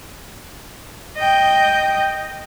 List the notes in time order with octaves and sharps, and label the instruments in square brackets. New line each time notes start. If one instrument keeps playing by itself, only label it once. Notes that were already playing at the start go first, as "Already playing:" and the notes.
[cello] D#5 G5